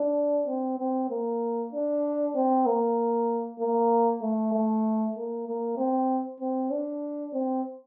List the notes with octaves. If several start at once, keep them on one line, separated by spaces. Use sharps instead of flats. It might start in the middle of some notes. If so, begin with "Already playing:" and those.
Already playing: D4
C4
C4
A#3
D4
C4
A#3
A#3
A3
A3
A#3
A#3
C4
C4
D4
C4